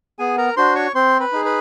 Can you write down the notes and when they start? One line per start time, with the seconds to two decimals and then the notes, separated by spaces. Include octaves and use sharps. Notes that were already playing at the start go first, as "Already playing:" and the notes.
0.19 B3 G#4 G#5
0.38 A#4 A#5
0.57 D4 F#4 C5 C6
0.75 C#5 C#6
0.95 C4 C5 C6
1.20 B4 B5
1.32 D#4 G#4
1.45 B4 B5